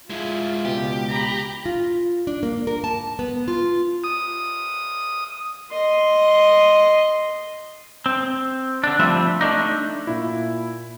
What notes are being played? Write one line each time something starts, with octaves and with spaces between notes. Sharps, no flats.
G#3 E4 F4
C#2 B2 G4
A#5 B5
F4
D4
A#3
A#4
A5
B3
F4
D#6
D#5 C6
C4
D3 D4
F3 G3 A3 C4 E5
A3 D4 D#4
A#2 E4